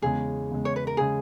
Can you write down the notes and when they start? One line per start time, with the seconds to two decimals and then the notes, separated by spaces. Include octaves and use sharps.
0.02 E2 C#3 G#3 G#4
0.50 E2 C#3 G#3
0.65 C#5
0.76 B4
0.87 A#4
0.97 C#3 G#3 G#4